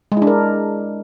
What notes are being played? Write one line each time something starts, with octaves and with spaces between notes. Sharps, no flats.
G#3
E4
D4
A#4